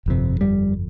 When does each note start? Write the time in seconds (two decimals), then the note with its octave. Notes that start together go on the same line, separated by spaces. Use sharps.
0.06 G1 F2 C3
0.41 G3